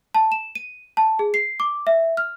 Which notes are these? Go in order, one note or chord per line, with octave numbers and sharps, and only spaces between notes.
A5
E7
D#7
A5
G#4
C7
D6
E5
F6